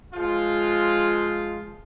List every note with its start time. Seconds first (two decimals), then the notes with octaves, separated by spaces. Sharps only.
0.14 F3 G#3 F4